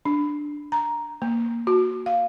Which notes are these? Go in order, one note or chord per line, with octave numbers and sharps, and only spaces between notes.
D4
A#5
A#3
F#4
F5